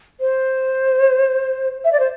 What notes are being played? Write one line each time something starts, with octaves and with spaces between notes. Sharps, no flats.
C5
E5
D5
C5